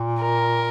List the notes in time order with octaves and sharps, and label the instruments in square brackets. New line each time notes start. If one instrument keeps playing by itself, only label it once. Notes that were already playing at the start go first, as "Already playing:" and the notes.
Already playing: [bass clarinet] A#2
[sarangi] A#4